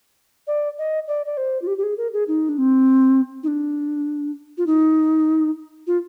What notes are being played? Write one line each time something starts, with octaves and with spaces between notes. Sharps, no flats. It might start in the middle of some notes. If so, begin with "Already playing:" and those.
D5
D#5
D5
D5
C5
F4
G4
G4
G#4
A#4
G#4
D#4
D4
C4
D#4
D4
F4
D#4
F4